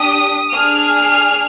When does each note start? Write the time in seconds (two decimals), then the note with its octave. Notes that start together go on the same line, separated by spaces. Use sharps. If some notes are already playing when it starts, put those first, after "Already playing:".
Already playing: D4 G4 D#6
0.53 D4 G#4 F6